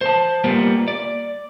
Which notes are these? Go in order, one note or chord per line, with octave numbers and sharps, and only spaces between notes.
C5 A5
G3 A#3 B3 F4
D5